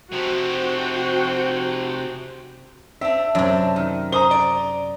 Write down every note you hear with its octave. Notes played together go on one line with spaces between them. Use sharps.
C3 F3 F#4 C5 G5
C4 D4 E5
F#2 C3 D4
D#3
C5 A#5 D#6 G7
D5